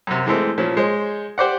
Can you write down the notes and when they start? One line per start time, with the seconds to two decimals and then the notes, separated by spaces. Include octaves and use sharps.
0.07 F#2 C3
0.26 E3 G#3 A3 C4
0.58 A#2 F3 C#4
0.77 G#3 C5 C#5
1.38 G4 C5 D5 F#5